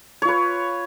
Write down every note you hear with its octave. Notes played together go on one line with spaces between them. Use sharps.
F4 B4 C#5